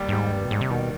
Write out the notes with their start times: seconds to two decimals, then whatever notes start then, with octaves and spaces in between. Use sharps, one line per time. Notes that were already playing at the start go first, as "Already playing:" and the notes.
Already playing: D#2 G3
0.09 G2
0.12 G#2 G3
0.32 G2 G3
0.45 B2
0.51 G#2 G3
0.61 C3
0.70 B2 D#3